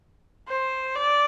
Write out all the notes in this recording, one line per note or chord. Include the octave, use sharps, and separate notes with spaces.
C5
D5